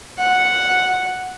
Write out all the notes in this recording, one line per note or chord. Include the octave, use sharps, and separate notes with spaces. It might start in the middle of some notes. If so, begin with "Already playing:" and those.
F#5